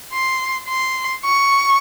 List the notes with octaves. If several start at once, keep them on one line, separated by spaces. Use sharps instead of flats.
C6
C6
C#6